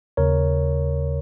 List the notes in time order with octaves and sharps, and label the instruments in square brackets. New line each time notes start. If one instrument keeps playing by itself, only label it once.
[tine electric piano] D#2 C#3 A#4 C#5